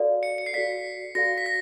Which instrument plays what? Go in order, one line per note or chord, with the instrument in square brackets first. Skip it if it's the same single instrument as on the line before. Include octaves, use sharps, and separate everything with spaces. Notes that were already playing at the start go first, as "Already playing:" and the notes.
Already playing: [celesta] F#4 A4 D5 F5
[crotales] C#7
C#7
C7
[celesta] F#4 A4 D5 F5 [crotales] B6
[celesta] F#4 A4 D5 F5 [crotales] A#6
[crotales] B6
A#6